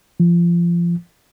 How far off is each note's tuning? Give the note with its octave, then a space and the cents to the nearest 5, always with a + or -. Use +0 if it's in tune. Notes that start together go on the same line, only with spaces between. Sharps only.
F3 -25